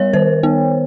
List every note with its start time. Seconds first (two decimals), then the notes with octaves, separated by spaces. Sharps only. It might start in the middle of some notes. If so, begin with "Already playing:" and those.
Already playing: G3 B3 A#4 C#5
0.13 D#3 C5
0.43 B3